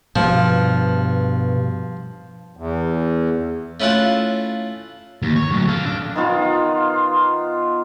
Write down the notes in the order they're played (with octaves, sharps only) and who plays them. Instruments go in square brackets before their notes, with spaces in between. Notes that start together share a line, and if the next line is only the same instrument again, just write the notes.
[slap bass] G2 [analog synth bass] B2 [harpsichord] F3
[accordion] E2
[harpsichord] A3 C#4 E4 F4 F#5
[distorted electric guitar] D#2
C#5
D2 F#3
A4 F5
D4
[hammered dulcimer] D#3 B3 F4